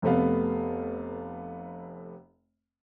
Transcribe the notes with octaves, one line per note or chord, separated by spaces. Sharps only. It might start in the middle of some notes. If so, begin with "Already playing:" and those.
F1 C3 A3 B3 F5